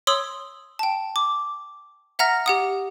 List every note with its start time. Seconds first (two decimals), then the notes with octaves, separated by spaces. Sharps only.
0.07 C#5 C6 D#6 E6 F#7
0.79 G5 A5
1.16 D6
2.19 E5 F#5 A#5 F6 A#6
2.46 G4 F#5 D#6